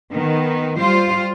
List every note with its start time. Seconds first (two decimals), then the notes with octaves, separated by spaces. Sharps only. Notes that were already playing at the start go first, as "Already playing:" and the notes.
0.12 D#3 B3
0.78 G3 F4 C5